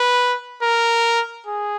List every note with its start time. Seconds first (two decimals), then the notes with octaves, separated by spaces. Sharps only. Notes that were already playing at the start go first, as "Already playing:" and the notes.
Already playing: B4
0.62 A#4
1.46 G#4